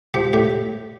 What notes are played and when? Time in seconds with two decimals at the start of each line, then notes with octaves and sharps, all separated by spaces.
0.14 F3 G4
0.33 A2 G4